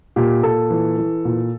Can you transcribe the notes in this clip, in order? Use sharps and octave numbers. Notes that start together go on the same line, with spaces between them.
A#2 G4
A#2 A4
E3
E3
A#2